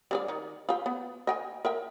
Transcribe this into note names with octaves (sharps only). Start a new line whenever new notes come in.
G3 D4 D5
D#3
F4 G4
B3
D#5 G5 G#5
A#4 E5 G5